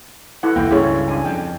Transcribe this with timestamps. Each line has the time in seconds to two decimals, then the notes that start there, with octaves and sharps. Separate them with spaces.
0.43 E4 A4 F#5
0.56 B1 E2 A#3 G5
0.71 C#2 G2 C#3 E4 G#4 C#5
1.08 D4 G#5
1.25 F2 G5